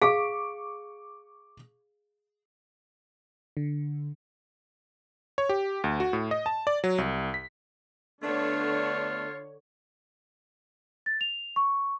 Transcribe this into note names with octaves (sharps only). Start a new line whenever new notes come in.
G#4 F5 C#6 D6 D7
D3
C#5
G4
D2
F#4
A2
D#5
A5
D5
F#3
C2
B6
D3 A3 B3 D4 F4 C#5
A6
F7
C#6